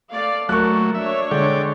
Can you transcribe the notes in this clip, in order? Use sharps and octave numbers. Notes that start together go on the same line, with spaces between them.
A3 D5 F5
F#3 A3 A#3 A#4 C#6 F#6
D4 C#5 E5
D3 G#3 D5 G5